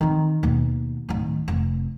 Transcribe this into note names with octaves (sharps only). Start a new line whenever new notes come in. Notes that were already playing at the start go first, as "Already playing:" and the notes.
D#3 C4
D#2 B2
D1 D#3
F1 C3